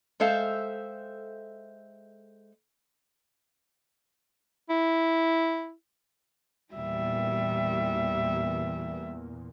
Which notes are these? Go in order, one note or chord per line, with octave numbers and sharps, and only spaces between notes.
G#3 A4 C5 E5 F5 G5
E4
E2 A#2 G3 E5